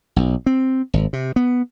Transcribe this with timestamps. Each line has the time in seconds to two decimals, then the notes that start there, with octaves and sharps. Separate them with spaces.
0.16 B1
0.46 C4
0.94 G#1
1.13 C3
1.36 B3